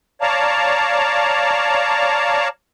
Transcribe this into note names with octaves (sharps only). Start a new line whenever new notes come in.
C#5 D5 F5 A5 A#5